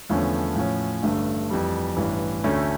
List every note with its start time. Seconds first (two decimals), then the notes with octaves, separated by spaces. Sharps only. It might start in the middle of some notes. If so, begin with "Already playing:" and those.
0.09 E2 D3 F3 A3 C#4
0.56 A2 F3 C#4
1.03 A1 G2 D3 A3
1.50 F2 E3 G3
1.97 A1 G2 E3
2.44 D2 D3 A3 C#4